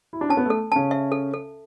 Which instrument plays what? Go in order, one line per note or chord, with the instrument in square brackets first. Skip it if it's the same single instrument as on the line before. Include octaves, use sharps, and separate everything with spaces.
[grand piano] E4
D4
[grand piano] C#4 [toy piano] A5
[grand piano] B3
[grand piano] A3 [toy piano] A4
[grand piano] C#3 C#4 [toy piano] A5
[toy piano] E5
A4
A4